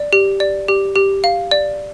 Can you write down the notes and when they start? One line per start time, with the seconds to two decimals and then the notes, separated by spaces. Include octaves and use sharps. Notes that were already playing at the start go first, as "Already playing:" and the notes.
Already playing: D5
0.13 G4
0.40 D5
0.68 G4
0.95 G4
1.24 F5
1.51 D5